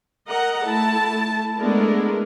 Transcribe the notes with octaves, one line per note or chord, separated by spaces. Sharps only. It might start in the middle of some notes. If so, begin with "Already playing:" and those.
A#4 D#5 F#5 A#5
A3 E4 A5
G#3 A3 B3 D4 E4 A#4